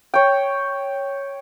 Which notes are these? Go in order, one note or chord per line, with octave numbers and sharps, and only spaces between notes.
C#5 G5